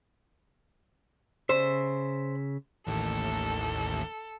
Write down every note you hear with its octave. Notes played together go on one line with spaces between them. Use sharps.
C#3 C5 E5
A1 D#2 A2 A4